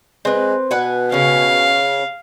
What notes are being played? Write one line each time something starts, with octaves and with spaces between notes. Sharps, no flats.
G#3 C4 B4
B2 B4 F#5 G#5
C#3 C#4 F5